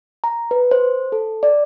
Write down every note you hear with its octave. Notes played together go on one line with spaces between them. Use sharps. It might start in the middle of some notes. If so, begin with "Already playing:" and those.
A#5
B4
C5
A4
D5